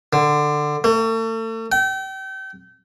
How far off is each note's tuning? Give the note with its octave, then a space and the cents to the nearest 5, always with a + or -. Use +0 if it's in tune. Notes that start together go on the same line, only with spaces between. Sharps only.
D3 +15
A3 +40
G5 -35